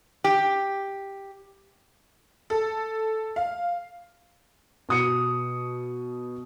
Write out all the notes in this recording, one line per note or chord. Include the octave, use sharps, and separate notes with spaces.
G4
A4
F5
B2 D#6 C#7